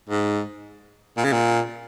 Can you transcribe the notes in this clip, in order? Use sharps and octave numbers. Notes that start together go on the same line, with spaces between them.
G#2
A#2
C#3
A#2